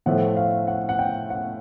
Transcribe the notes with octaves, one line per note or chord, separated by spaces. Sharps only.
A2 F3 A3 F#5
F5
F#5
F#5
G5
F#5